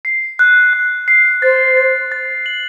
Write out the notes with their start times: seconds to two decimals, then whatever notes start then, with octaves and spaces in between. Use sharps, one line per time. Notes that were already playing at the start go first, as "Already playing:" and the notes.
0.05 C7
0.39 F#6
0.73 F#6
1.08 C7
1.42 C5 A6
1.77 A6
2.12 A6
2.46 F#7